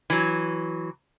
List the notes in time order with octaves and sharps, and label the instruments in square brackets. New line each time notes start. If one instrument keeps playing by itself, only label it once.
[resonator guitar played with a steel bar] E3 F#3